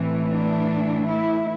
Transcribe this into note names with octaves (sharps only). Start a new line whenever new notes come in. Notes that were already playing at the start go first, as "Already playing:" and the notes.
Already playing: A2 E3 A3 C4
D4
E4